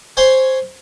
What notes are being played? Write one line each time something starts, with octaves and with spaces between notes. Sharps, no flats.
C5 C#5 G#5 C6